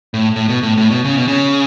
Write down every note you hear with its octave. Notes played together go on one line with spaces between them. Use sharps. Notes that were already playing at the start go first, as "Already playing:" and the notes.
A2
A2
B2
A2
A2
B2
C#3
B2
C#3